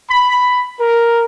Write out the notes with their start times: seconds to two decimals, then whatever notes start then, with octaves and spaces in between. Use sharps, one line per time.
0.11 B5
0.80 A#4